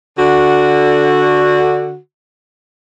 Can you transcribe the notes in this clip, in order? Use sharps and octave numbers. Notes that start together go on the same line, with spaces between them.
D3 F#4